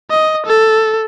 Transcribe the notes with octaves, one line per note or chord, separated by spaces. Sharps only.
D#5
A4